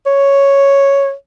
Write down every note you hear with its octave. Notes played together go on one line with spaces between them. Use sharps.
C#5